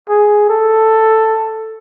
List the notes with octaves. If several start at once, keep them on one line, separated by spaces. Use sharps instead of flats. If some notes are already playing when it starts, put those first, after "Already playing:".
G#4
A4